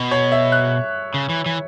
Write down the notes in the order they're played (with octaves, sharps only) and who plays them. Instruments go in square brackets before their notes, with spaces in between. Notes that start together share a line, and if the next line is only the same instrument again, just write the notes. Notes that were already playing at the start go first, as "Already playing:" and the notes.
Already playing: [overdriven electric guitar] B2
[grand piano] C#5
E5
F#6
[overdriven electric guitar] C#3
E3
E3